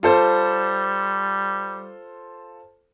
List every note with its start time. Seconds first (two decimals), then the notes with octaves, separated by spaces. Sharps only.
0.03 G3 F4 A4 C5